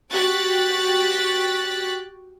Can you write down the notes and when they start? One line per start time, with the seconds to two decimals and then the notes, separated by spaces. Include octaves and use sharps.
0.11 F#4 G4 G5 F#6 A6 B6